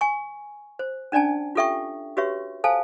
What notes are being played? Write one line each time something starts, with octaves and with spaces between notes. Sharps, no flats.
G#5 C#6
C5
C#4 D4 D5 G#5 A5
F4 G4 A4 E5 G5 C#6
F#4 G4 B4 C#5 E5 C#6
A4 C5 F5 G#5 A5